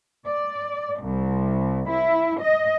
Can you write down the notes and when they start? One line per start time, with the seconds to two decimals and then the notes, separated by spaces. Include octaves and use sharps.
0.27 D5
1.02 C2
1.90 E4
2.41 D#5